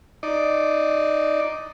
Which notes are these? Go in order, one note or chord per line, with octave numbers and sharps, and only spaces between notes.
D#4 D5